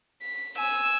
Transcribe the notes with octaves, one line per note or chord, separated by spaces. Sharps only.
B6
G#5 E6